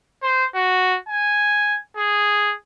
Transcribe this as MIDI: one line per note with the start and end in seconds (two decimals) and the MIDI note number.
0.22 0.45 72
0.55 0.98 66
1.09 1.79 80
1.97 2.55 68